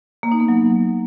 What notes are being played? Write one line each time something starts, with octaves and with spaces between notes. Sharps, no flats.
A#3
D#4
B3
F#3